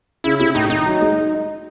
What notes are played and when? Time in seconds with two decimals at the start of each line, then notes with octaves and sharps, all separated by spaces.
0.24 C#3 E4
0.40 C3 E4
0.55 A2 D#4
0.70 D#3 D#4
0.86 F#3
1.01 G#3